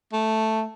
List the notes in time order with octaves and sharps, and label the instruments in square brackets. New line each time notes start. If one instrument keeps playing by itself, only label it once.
[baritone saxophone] A3